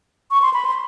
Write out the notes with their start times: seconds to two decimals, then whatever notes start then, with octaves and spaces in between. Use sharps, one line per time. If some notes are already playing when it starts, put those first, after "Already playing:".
0.31 C#6
0.42 C6
0.54 B5
0.65 C6